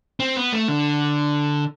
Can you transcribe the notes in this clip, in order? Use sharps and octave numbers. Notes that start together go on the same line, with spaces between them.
C4
B3
A3
D3